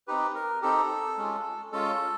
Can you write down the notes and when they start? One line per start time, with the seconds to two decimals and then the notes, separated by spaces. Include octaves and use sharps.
0.08 C4 D#4 G4 B4
0.35 A#4
0.62 C4 D#4 G4 A4
1.18 G#3 C#4 F4
1.72 G#3 C#4 F4 A4